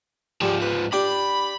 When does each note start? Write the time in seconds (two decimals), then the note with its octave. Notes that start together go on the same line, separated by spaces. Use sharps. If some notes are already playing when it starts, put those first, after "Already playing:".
0.41 G#2 F3 G3
0.62 B4
0.92 D4 G4 G5 B5